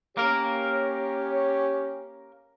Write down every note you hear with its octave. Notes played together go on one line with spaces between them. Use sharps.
A#3 C#4 G4 A#4 C#5